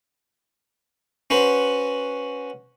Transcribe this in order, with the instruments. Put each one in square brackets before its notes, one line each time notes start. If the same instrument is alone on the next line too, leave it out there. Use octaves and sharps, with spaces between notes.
[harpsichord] C#4 F#4 B4 C5